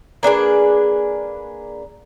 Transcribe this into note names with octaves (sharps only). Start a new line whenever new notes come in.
A#3 D4 G#4 B4